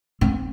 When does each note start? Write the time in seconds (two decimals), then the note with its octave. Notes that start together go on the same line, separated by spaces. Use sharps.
0.21 C4